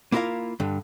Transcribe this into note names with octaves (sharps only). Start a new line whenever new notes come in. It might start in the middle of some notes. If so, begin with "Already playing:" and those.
A#3 B3 E4 F4 A#4 F5
G2 D3